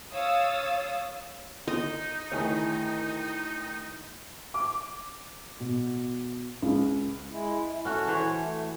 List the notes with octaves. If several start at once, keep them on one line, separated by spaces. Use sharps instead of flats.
C#5 F5 D#6 E6 A6
D#4 D#5
D2 D#3 E4 G#4 C#5
D6
B2
C#2
G#3 E4
E4
C#4 F#4 A4
E3 C5 C#5
A3